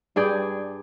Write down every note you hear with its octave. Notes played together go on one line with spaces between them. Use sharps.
G2 G#4 D5 G5